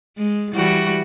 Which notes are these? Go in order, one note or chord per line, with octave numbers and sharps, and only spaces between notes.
G#3
E3 G3 F#4